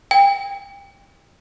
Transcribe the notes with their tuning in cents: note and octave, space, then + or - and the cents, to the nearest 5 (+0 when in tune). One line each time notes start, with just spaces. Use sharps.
G5 +30